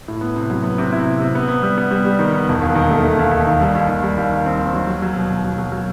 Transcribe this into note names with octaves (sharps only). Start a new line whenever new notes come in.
A2
B3
C3
F#3
B3
C3
E4
C3
C3
B3
B3
G3
B3
G3
G3
D#3
B3
E1
D#2
D#3
A3
A3
D#2
D#2
D#3
G3
D#2
D#2
G3
D#2
D#3
C4
D#2
F#3
F#3
F#3
B2
B2
F#3
F#3
F#3